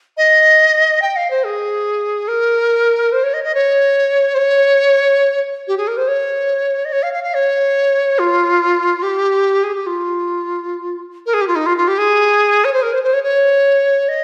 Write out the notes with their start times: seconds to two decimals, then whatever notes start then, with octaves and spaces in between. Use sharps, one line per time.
0.17 D#5
1.02 G5
1.16 F5
1.30 C5
1.44 G#4
2.28 A#4
3.12 C5
3.23 C#5
3.33 D#5
3.44 D#5
3.54 C#5
4.34 C5
4.38 C#5
5.67 G4
5.77 G#4
5.87 A#4
5.97 C5
6.07 C#5
6.85 D#5
6.92 C#5
7.02 F5
7.13 F5
7.23 F5
7.34 C#5
8.19 F4
9.02 G4
9.63 G#4
9.75 G4
9.86 F4
11.26 A#4
11.33 G#4
11.41 G4
11.47 F4
11.55 D#4
11.66 F4
11.77 F4
11.87 G4
11.98 G#4
12.64 C#5
12.73 C5
12.82 A#4
12.92 C5
13.03 C5
13.13 C#5
13.23 C#5
14.08 D#5